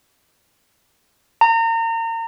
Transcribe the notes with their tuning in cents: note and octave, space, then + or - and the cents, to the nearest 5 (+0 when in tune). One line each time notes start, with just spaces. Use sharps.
A#5 -35